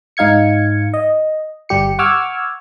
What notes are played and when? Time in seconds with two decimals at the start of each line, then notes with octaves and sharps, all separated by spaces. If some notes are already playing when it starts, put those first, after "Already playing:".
0.17 G#2 D#4 F5 G#6 C#7
0.94 D#5
1.69 G1 G3 G4 C#7
1.99 F#5 C#6 D6 E6 F6 G#6